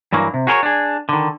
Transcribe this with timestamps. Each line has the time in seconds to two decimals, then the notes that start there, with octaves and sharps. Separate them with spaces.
0.12 G2 E3 F#3 A#3
0.34 C3
0.47 F#4 G#4 A#4 B4 C#5
0.63 D4 G#4
1.09 D3 D#3